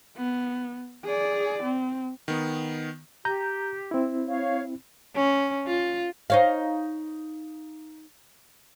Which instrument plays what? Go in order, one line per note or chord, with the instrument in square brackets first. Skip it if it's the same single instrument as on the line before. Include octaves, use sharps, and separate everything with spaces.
[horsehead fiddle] B3
G#4 D5
C4
[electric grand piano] D#3 B3
[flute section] G4 [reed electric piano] A#5 G6
[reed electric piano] C4 E4
[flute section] C#5 F5
[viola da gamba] C#4
F4
[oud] D#4 C#5 F5